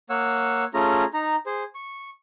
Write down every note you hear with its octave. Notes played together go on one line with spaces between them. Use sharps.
A#3 C#5 F#5 E6
A3 C#4 F4 G#4 A#5
D#4 A#5
G#4 C5
C#6